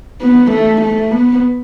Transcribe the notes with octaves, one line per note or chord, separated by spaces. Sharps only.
B3
A3
A3
B3